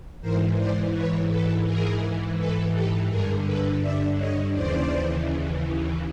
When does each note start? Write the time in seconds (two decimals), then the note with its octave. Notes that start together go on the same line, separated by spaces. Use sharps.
0.21 G#2 E3 A#4 C5
0.57 C5 D5
0.93 B4 C#5
1.29 A4 B4
1.65 G#2 E3 G#4 A#4
2.37 A4 B4
2.73 G4 A4
3.09 G2 D3 G#4 A#4
3.45 A4 B4
3.81 D5 E5
4.17 C#5 D#5
4.53 D#2 C#3 E3 C5 D5